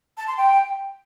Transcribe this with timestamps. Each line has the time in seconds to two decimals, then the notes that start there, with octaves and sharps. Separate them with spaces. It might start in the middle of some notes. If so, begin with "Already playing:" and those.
0.17 A5
0.27 C6
0.37 G5